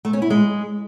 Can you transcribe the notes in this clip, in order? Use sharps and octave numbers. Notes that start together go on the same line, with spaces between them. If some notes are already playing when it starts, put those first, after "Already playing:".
A3
C#4
E4
G#3